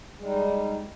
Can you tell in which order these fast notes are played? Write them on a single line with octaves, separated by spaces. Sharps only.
G#3 G3 D#4